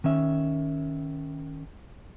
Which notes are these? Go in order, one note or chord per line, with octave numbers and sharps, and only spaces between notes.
D#3 C#4 E5